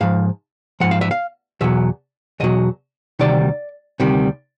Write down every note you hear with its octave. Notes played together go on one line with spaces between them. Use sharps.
G#2 F3 F5
G#2 F3 F#5
F5
E5
F5
E2 B2 F#3 E5
E2 B2 F#3 D#5
D2 C3 D#3 G3 D5
D2 C3 D#3 G3